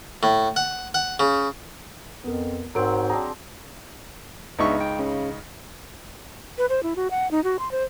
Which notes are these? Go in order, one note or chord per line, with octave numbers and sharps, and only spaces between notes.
A2
F#5
F#5
C#3
F2 B3 A#4
G#2 F#3 C4 A#4 D7
D4 G#4 G5 A#5
C#2 B3 D4 D#4 E5 C#6
G5
C#3
B4
C5
E4
F#4
F#5
D#4
F#4
C6
C5